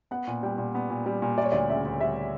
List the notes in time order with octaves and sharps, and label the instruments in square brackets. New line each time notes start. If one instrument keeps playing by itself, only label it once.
[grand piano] B3 [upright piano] F#5
[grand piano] A#2
[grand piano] G3 [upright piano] G5
[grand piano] A#2
B3
A#2
G3
A#2
[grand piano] G3 [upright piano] D5
[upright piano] C#5
[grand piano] D2 [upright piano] D5
[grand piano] C#3 [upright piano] E5
[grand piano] D2
[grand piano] G3 [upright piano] E5